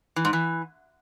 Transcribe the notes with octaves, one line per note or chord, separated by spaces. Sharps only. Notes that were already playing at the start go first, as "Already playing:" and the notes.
E3
G#2
E3